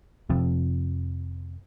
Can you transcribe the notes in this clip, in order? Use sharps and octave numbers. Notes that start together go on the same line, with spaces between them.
F1 F2